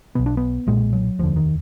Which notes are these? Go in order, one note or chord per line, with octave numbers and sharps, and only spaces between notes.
B1 B2 B3
D4
B3
B1 A#2 G#3
F#3
F1 D#2 D3 F3
D#3